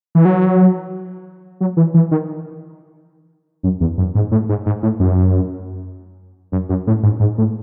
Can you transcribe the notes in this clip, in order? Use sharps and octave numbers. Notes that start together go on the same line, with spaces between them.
E3
F#3
F#3
E3
E3
D#3
F#2
E2
F#2
G#2
A2
G#2
G#2
A2
F#2
F#2
F#2
A2
G#2
G#2
A2